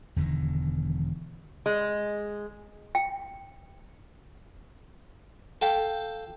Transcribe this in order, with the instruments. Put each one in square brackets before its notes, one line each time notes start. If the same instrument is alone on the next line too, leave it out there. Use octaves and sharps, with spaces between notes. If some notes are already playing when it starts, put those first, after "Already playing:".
[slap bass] E1 E2 D3 D#3
[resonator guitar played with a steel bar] G#3
[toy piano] G5
[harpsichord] A4 F5 G5